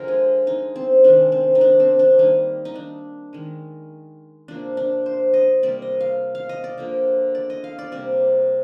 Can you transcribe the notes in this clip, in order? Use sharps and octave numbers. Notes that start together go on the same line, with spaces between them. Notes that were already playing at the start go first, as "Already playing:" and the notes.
Already playing: D3 F3 G#3 A#4
G#4
D#4
C4
C3 D#3 G#3 D4
C4
D#4
D4
C4
D4
D#3 G3 A#3 D#4
D#4
D4
D#3 G#3
C3 F3 A#3 D4
D4
C5
D#5
C3 G3 A#3 D5
D#5
F5
F5
D#5
D5
D3 F3 A#3
D5
D#5
F5
D5
C3 G3 A#3 D5